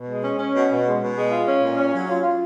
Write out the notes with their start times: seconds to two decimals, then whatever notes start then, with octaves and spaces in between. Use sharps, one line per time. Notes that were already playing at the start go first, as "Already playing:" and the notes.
Already playing: B2
0.08 G#3
0.24 C#4
0.39 C#4
0.55 B2
0.70 B2
0.86 G#3
1.01 B2
1.15 G#3
1.31 F4
1.47 C#4
1.62 A#2
1.77 C#4
1.93 F#3
2.08 F4
2.23 F4